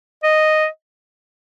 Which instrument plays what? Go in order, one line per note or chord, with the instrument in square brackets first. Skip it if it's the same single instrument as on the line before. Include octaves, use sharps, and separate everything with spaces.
[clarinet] D#5